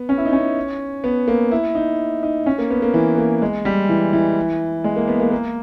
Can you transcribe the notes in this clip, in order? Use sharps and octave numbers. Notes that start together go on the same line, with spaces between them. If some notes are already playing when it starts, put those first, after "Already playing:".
Already playing: B3
C#4
E4
D#4
C#4
B3
A#3
E4
D#4
D#4
C#4
A#3
B3
A#3
E3
A#3
G#3
G3
E3
E3
G#3
A#3
B3
A#3
A#3